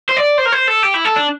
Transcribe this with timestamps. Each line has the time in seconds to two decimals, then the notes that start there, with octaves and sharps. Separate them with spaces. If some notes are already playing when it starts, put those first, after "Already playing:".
0.09 C5
0.16 D5
0.38 C5
0.46 A#4
0.53 C5
0.68 A4
0.83 G4
0.94 E4
1.05 A4
1.17 D4